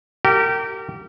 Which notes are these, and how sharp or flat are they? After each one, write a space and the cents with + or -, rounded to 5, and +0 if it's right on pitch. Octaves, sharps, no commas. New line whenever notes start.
G4 -25 A#4 -30